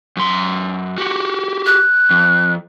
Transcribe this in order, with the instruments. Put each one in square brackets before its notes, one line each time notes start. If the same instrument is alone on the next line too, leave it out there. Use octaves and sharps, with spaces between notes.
[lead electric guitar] F#2 C6
F#4 G4
[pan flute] F#6
[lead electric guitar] F2